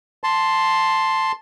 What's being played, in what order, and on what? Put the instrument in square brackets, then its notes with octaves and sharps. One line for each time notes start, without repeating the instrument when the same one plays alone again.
[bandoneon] A5 C6